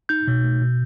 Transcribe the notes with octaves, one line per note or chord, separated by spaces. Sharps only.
D#4 G6
B2
A3
B2